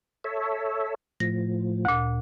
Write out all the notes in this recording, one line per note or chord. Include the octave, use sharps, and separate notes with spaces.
A4 C#5 E5
A2 F3 A#6
D2 A#2